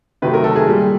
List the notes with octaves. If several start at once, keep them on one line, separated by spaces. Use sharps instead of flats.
C3 D#3 F#3 A3 B4
A#4
A4
G#4
A#2 G3